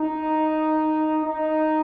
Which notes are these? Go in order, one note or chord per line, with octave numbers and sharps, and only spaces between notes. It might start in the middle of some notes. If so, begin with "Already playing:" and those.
Already playing: D#4
D#4